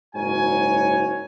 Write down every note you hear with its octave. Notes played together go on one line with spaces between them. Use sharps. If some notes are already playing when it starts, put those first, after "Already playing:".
F#1 G#2 F#4 A#4 C#5 G#5